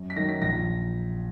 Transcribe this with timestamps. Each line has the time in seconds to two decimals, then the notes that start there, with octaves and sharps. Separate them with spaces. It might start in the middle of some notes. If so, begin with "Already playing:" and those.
Already playing: F#2
0.10 B6
0.16 D#3 F#3 A#6
0.29 B6
0.41 A#1 A#6